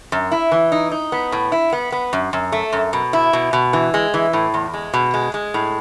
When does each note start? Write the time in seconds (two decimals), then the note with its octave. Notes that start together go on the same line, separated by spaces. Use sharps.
0.12 F#2
0.31 E4
0.52 E3
0.72 D#4
0.91 D#4
1.12 B3
1.32 A2
1.52 E4
1.73 B3
1.92 B3
2.13 F#2
2.33 F#2
2.52 A3
2.73 F#2
2.93 B2
3.13 E4
3.33 B2
3.53 B2
3.73 E3
3.94 G#3
4.14 E3
4.33 A2
4.54 E2
4.74 G#3
4.93 B2
5.14 G#3
5.34 G#3
5.54 A2